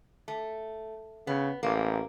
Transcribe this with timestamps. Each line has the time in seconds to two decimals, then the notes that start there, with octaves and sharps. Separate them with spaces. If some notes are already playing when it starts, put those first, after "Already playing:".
0.28 A3
1.27 C#3 B3
1.63 A1 A#3